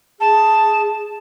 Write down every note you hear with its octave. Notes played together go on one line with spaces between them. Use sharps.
G#4 A5